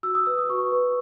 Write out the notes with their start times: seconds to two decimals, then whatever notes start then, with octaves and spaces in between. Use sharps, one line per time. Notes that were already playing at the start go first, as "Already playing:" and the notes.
0.03 F#4 E6
0.15 D#6
0.26 B4 E6
0.38 D#6
0.49 F#4 C#6
0.72 B4